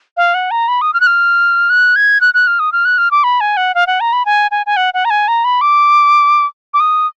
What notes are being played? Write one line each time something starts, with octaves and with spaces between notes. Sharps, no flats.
F5
F#5
A#5
B5
D#6
F6
F#6
F6
F#6
G#6
F#6
F#6
F6
D#6
F6
F#6
F6
D6
B5
G#5
F#5
F5
F#5
A#5
B5
G#5
G#5
G#5
F#5
F#5
A#5
G#5
A#5
B5
D6
D6
D#6